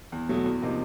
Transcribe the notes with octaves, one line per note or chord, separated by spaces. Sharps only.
E2
B2 F#3 A3
E2
C3 F3 A#3 D#4